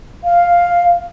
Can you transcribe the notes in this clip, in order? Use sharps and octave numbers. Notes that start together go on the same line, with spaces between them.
F5